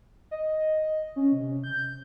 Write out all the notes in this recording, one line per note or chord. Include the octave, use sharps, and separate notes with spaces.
D#5
C#4
C3
G6